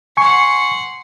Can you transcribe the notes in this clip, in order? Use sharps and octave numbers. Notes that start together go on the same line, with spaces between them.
F#5 G#5 C6 C#6